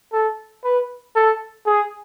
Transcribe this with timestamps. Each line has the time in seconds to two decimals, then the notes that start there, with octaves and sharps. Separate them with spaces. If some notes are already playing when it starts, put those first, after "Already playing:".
0.13 A4
0.64 B4
1.15 A4
1.66 G#4